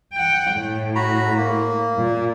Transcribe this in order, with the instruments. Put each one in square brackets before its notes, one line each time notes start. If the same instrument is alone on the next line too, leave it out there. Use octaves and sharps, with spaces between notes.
[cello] F#5 G5
A2
[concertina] F#4 A#5 B5
A#3
[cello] A#2